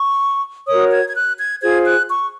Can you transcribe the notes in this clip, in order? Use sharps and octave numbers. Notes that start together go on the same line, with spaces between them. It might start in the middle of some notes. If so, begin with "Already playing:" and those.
Already playing: C#6
F#4 A#4 C#5 D#6
G#6
G#6
F#6
G#6
F4 G#4 C5 G#6
F#6
C#6